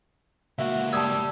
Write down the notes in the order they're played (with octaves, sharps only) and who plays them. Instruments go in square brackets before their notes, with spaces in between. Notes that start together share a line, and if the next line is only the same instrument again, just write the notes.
[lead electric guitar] C#2 A#3 [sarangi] F#4 [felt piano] E5
[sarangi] G3 [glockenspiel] A5 E6 [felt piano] D#6 G#6